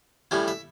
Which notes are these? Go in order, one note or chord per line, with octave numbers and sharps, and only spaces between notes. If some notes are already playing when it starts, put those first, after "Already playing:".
A2 G3 C#4 E4
E5